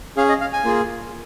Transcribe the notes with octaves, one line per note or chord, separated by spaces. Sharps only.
C#4 G#4 F5
D#5
F5
G#5
A#3 F4 G#4